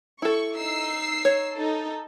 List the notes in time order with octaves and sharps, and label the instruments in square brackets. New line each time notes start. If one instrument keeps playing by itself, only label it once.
[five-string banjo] E4 A4 [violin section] C#6
[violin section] D#4 E6 C7
[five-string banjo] C#5
[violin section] D#4 A4